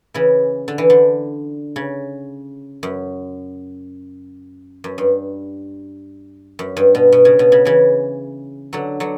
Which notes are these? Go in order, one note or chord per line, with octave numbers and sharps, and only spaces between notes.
C#3 E3
D3
E3
D3
C#3
F#2
F#2
G2
F#2
G2
B2
B2
C#3
B2
C#3
C#3 E3
D3 F#3
D3 F#3